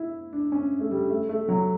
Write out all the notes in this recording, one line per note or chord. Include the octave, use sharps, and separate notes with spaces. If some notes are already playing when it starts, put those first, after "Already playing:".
Already playing: E4
D4
C#4
A3
G3
A3
A3
F#3